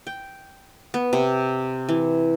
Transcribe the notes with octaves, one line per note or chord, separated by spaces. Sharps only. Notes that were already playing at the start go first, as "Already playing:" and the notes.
G5
B3
C3
E3